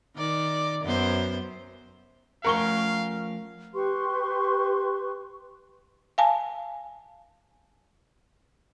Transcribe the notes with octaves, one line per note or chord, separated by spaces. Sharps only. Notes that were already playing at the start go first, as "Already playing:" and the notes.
D#3 D5
F#2 B3 C5
F3 A3 C#4 A#4 F5 F#5 C#6 G7
G4 B4 C6 C#6
F5 G#5 A5